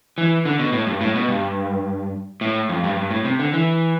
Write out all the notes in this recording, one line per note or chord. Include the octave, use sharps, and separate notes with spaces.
E3
D3
B2
A2
G2
A2
B2
G2
A2
F2
G2
G2
A2
C3
D3
E3